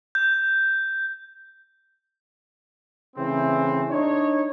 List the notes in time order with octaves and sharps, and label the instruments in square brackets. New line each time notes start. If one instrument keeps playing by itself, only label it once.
[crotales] G6
[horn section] C#3 E3 A3 C4
D4 D#4 C#5